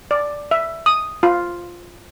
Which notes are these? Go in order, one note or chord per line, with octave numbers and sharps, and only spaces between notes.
D5
E5
D#6
F4